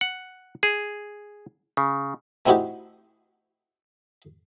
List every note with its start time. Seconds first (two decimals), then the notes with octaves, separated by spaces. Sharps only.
0.01 F#5
0.63 G#4
1.77 C#3
2.46 A3 C4 D#4 E4 F#4 G4